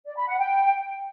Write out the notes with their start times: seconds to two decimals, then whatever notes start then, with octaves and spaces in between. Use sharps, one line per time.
0.06 D5
0.17 B5
0.27 F#5
0.37 G5